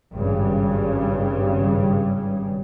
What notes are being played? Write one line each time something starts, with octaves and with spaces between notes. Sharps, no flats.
G#1 G2 C#3 G3